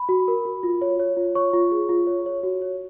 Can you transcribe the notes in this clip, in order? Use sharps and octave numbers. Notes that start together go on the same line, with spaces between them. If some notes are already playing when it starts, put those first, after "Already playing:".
Already playing: B5
F#4
A#4
F#4
F4
C#5
C#5
F4
C#5 C#6
F4
G#4
F4
C#5
C#5
F#4
C#5